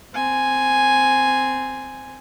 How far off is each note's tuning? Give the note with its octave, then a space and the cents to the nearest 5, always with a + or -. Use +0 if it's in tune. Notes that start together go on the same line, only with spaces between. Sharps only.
C4 -10 G#5 +0